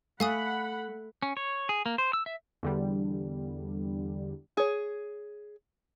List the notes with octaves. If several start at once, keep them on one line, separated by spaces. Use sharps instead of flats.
A3 F5 F#5 G#5 B5 D#6
C#4
C#5
G#4
A#3
C5
E6
E5
E2 D3 G3
G#4 C#5